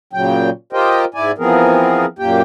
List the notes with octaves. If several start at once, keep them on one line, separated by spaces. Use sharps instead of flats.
A#2 C#3 F#3 G5
F4 G4 A#4 C5 D#5 G5
G#2 E4 D5 G#5
E3 F3 B3 C4 G#4 A#4
F#2 A#2 A#3 G4 G5